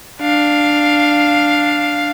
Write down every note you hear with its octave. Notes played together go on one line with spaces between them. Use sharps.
D4 F5